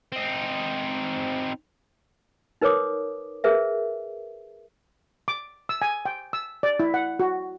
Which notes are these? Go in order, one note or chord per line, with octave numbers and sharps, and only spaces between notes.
C4 D#4
D#4 A#4 B4 C#5 D6 D#6
G#4 A#4 B4 E5
D6
E6
G#5
G5
E6
D5
E4
F#5
F#4